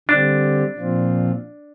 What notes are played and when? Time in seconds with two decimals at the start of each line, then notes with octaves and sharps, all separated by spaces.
0.09 D3 G3 C4 D4 G4
0.77 A#2 F3 C4 F4